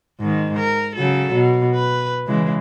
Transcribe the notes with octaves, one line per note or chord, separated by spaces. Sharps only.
G#2 D#3
A#4
C#3 F#3 A4
B2
B4
C#3 E3 G#3